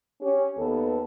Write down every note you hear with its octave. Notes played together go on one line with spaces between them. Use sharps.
C#4 G4
D#2 B3 A4